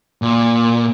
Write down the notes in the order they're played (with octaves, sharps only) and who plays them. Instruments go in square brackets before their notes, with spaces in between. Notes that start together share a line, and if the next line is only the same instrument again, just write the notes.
[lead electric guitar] A#2